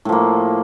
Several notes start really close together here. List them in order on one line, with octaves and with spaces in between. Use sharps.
A2 F3 A#3